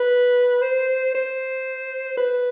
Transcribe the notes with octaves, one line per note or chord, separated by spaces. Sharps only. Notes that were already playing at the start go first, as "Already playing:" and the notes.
Already playing: B4
C5
C5
B4